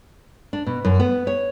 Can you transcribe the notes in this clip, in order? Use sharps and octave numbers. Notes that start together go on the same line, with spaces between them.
D4
B2
F#2
B3
C#5